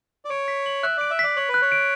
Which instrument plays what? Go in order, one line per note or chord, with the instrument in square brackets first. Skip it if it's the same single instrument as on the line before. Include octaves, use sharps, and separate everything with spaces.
[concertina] D5
[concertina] C#5 [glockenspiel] D7
[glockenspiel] B6
F#7
[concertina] E5 [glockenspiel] F#6
[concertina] D5 [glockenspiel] D7
[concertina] E5
[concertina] D5 [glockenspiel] B6
[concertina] C#5 [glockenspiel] F#7
[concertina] B4
[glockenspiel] F#6
[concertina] C#5
[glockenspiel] D7